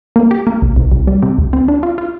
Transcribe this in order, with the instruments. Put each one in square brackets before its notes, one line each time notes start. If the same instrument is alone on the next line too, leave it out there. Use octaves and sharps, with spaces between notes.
[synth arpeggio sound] A#3
G4
A#3
C2
C2
C2
G3
C3
D2
C4
D4
F4
F4